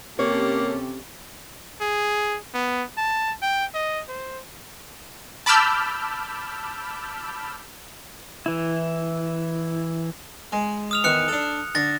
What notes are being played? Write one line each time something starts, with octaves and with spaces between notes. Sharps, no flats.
C3 A#3 C#4 G4 A4 C#5
G#4
B3
A5
G5
D#5
C5
A5 B5 D6 E6 F6 G6
E3 E4
G#3
D#6 F6 F7
E2 D#3 F#6 C#7
D4 A4
D3 A6 A#6